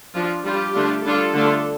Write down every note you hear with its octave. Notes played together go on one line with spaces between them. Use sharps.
F3 D4 F4
G3 D4 F4 G4
D3 A3 D4 F4
G3 D4 F4 A4
D3 A3 D4 F4